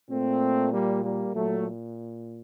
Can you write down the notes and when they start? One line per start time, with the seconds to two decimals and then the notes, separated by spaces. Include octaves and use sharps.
0.10 A#2 A3 C4
0.72 G3 A#3
1.03 G3 A#3
1.34 A#2 F#3 A3